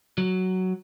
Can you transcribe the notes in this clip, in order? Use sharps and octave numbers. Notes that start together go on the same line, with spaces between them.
F#3